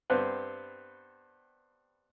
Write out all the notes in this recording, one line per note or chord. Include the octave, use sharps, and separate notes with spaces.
G2 B3 C4